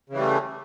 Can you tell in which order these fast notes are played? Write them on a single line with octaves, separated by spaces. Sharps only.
C#3 E3 G3 A3